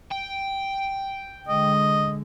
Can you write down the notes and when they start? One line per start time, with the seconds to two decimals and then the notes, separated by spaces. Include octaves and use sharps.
0.11 G5
1.48 D3 G#3 D#5